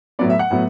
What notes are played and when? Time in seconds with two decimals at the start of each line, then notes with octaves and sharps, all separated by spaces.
0.19 A2 F#3 B3 D5
0.30 E5
0.39 F#5
0.51 A2 F#3 B3